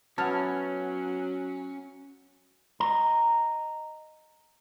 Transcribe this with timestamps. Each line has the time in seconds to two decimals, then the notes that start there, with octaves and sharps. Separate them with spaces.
0.18 F#3 B3 C#4 E4 A5 F6
2.80 D#5 A#5